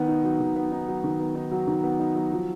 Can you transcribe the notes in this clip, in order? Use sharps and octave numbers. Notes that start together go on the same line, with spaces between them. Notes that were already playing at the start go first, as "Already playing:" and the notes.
Already playing: D#3 B3
D#4
F#3
D#3
B3
D#4
F#3
D#3
B3
D#4
F#3
D#3
B3
D#4
F#3
F3